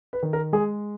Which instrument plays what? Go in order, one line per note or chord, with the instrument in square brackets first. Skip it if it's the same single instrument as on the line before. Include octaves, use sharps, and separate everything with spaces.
[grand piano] B4
[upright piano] D#3
[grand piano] A#4
[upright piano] G#3 [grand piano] G#4